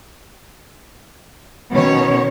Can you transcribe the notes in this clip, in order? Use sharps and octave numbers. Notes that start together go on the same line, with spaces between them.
B2 D#3 C#4 C#5